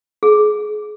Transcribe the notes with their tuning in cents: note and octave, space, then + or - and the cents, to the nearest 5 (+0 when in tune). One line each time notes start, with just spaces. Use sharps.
G#4 +30